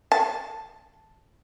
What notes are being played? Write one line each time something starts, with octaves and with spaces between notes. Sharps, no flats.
A5